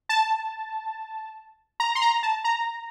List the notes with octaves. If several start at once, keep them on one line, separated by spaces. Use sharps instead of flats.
A5
A#5
C6
A#5
A5
A#5